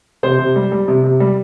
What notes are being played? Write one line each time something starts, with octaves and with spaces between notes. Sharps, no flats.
C3 C5
C3
G3
G3
C3
C3
G3